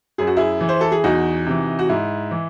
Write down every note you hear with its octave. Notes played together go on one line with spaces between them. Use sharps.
F#2 G#4
F#4
E4 G#4
E3
C5
A4
G#4
E2 D#4 F#4
C3 E3
F#4
G#2 E4
E3